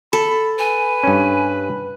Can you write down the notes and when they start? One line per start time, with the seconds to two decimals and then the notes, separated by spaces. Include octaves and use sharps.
0.13 A4 B5
0.59 B4 G#5
1.03 G2 C#4